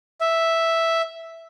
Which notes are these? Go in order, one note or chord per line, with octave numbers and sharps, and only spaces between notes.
E5